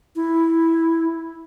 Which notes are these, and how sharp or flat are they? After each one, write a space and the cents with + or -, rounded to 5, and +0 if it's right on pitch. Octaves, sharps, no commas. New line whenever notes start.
E4 -5